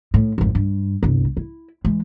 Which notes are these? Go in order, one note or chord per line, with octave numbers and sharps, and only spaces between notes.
A2
G#1 F2
G2
G1 C2
E4
E3 G#3